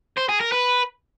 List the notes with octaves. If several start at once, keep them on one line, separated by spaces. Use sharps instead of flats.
C5
G#4
A#4
B4